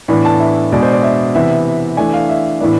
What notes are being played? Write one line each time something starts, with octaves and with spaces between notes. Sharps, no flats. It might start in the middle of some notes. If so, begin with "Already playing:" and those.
A2 E3 B3 D4
A5
E5
B2 G#3 D4 D5
C5
D5
E5
C3 E3 B3 E5
E3 A3 D4 G#5
F5
E5
A2 E3 B3 D4